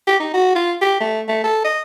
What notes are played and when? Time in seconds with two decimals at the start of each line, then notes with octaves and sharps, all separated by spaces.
0.07 G4
0.20 D#4
0.34 F#4
0.55 F4
0.82 G4
1.01 A3
1.28 A3
1.44 A4
1.64 D#5